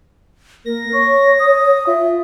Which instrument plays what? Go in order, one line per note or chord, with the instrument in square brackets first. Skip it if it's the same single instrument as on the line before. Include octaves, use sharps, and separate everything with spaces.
[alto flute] A#3 [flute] A#4 [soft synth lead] A#6
[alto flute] C#5 [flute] C#6
[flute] D#6
[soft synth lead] F4 [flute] E5